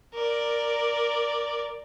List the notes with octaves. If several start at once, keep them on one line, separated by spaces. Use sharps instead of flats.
A#4 D5